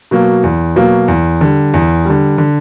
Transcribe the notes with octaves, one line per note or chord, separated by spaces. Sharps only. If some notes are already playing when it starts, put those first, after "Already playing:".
B2 F#3 A#3
E2
B2 F#3 A#3
E2
D3 G3
E2
D3 G3
D3